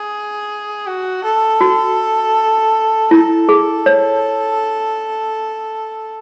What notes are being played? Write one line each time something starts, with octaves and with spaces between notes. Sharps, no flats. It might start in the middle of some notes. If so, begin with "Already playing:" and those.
Already playing: G#4
F#4
A4
F#4
E4 A4
G#4
C#5